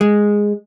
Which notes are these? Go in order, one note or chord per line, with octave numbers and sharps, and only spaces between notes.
G#3